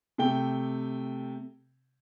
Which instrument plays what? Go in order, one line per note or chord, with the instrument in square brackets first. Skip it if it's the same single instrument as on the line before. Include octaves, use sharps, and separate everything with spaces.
[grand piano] C3 A3 G5 G7